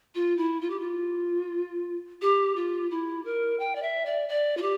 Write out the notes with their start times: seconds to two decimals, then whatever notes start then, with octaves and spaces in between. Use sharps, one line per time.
0.15 F4
0.37 E4
0.61 F4
0.70 G4
0.80 F4
2.22 G4
2.56 F4
2.91 E4
3.25 A#4
3.60 G5
3.75 D5
3.82 E5
4.06 D5
4.29 D5
4.57 F4
4.62 G4